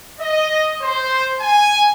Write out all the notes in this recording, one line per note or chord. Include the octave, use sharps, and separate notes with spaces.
D#5
C5
G#5